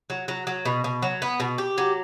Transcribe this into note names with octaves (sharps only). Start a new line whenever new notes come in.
F#3
F#3
F#3
B2
B2
F#3
B3
B2
G4
F#3